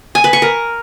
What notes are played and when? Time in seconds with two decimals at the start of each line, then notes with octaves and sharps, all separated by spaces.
0.15 G#5
0.24 B4
0.33 C#6
0.42 A#4